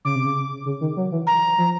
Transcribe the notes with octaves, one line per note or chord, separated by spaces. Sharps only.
C#3 D6
C3
C#3
C#3
D#3
F#3
E3
A#5
F3